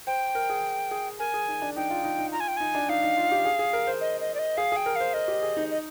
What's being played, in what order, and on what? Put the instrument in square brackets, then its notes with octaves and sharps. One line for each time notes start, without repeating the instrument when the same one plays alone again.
[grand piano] C5 [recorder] G5
[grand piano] A#4
G#4
G#4
[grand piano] A#4 [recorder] G#5
[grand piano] G#4
D#4
D4
[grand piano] D#4 [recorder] G5
[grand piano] F4
D#4
D#4
[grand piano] F4 [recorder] A#5
[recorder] G#5
G5
[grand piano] D#4 [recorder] G#5
[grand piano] D4
[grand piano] D#4 [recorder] F5
[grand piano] D#4
F4
G4
G#4
G#4
A#4
C5
[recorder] D#5
D#5
D5
D#5
[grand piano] G#4 [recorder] F5
[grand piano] G#4 [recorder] G5
[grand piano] A#4
[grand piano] C5 [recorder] F5
[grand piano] A#4 [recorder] D#5
[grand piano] G4
G#4
D#4
[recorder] D#5